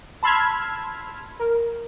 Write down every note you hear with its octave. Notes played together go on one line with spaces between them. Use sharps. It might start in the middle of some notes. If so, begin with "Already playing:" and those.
A5 B5 C6 E6 F6 G#6
A#4